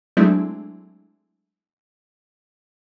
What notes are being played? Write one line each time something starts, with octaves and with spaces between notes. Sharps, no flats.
F#3 G#3 A3 C4 D4 E4